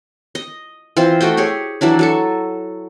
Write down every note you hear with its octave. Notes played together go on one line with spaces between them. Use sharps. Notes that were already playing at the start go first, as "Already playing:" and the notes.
D#5
E3 C4 F4 C5
A3 F#4 D#5 G5
G4 G#4 C#5
E3 F#3 D4 E4
F#3 A4 C#6